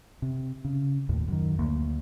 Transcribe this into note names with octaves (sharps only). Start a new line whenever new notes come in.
C3
C#3
D#2 A2
F#2 D#3
D2 A#3